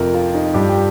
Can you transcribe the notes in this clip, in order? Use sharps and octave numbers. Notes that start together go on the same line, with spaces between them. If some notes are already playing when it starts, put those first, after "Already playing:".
Already playing: F2 C3 F3 A#4
F4
D#4
G2 F3 G4
G4